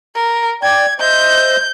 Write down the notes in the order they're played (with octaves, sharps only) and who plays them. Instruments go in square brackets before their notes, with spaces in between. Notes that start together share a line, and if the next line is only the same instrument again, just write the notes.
[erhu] A#4
[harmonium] D5 G5 [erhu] G#6
[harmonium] C5 D#5 E5 [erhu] G6